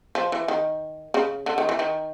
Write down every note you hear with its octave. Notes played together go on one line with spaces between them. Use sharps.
F3
E3
D#3
C#3
D3
D#3
E3
D#3